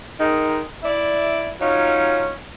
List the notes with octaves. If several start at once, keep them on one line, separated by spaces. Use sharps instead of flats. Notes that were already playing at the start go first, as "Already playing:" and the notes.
D#3 G#3 D#4
E4 D5
F#3 C#4 D#4 F4